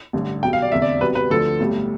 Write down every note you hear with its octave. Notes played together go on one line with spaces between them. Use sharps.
A1 G2 D3 G3
B1 B2 G3 G5
F5
D5
F1 E2 D3 E5
D5
C2 B2 G3 B4
B4
D2 D3 F3 A4
B1 A2 G3